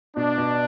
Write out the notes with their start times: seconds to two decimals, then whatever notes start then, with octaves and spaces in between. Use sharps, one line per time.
0.16 B2 D4
0.38 B2